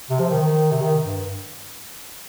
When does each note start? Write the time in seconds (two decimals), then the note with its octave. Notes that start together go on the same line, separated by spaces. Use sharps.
0.10 C3
0.19 F3
0.30 D#3
0.41 D#3
0.71 C3
0.82 D#3
1.04 G2